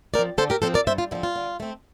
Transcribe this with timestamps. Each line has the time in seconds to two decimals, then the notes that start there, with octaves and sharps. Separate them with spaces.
0.14 C4 A#4 D5
0.19 F3
0.38 D3 A4 C5
0.50 G4 A#4
0.62 F3 C4 A4 C5
0.74 A#4 D5
0.87 G2 C5 E5
0.98 F4
1.11 D3 F3 C4 E4
1.23 F4
1.36 D3
1.60 A3 C4